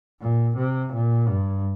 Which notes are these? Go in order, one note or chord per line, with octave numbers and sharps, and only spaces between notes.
A#2
C3
A#2
G2